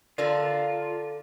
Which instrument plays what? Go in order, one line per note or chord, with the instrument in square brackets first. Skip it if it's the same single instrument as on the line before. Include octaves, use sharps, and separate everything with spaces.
[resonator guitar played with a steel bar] D3 A4 A#4 [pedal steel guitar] F4 [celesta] D5